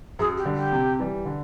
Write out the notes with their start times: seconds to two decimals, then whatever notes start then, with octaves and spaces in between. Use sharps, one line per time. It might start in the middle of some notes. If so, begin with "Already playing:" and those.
0.19 F#2 G#4
0.37 G4
0.46 D3 G3
0.55 G4
0.72 C3
0.99 E3 G3
1.25 D3